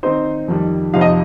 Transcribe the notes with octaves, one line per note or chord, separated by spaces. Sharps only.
D#3 C4 D#4 C5
F2 D#3 G3
F2 C3 F3 D#4 F5
D#5